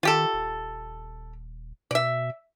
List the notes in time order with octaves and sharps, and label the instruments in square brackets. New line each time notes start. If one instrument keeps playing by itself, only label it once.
[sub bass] D#3 [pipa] F4 G4 A4
[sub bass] D#1
[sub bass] B2 [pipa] D5 E5